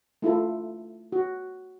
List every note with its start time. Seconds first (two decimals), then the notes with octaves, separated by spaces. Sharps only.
0.22 A3 E4 F4 A4
1.12 F#4